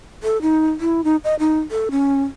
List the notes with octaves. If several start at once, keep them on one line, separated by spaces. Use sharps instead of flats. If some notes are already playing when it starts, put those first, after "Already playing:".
A4
D#4
E4
D#4
D#5
D#4
A4
C#4